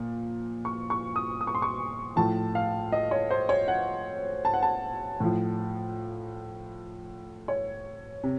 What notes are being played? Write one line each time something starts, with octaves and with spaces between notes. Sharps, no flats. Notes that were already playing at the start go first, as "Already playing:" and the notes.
Already playing: A#2 F3
C#6
C#6
D#6
D#6
C#6
C6
C#6
A2 F3 A5
F5
D#5
C#5
C5
C#5
F#5
A5
F#5
A5
A2 F3
C#5
C3